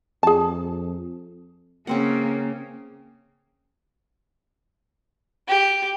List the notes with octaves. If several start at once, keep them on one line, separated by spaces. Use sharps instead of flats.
F2 G#4 A5
C#3 A#3 C4 C#4 F#5
G4